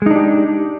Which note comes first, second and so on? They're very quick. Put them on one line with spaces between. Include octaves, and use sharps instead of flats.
G#3 D#4 D4 G4